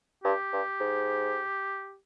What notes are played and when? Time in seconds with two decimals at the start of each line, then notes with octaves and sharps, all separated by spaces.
0.24 G2 G4
0.53 G2
0.80 G#2